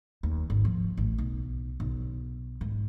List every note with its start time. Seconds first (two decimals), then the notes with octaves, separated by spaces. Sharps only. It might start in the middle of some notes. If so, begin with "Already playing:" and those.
0.23 D#2
0.50 G#1
0.65 F3
0.97 A1
1.18 B1
1.80 B1
2.61 G#2